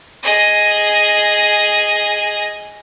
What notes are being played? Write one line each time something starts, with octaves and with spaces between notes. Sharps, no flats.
G#4 D#5